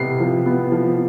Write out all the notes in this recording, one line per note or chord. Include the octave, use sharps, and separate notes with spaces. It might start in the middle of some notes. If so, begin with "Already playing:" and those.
Already playing: C3 B3 C7
F3
B3
F3